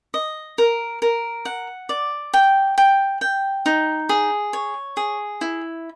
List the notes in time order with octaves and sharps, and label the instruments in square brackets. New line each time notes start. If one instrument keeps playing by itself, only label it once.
[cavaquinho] D#5
A#4
A#4
F#5
D5
G5
G5
G5
D#4
G#4
C#5
G#4
E4